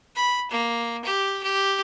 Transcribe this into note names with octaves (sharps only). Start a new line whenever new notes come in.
B5
A#3
G4
G4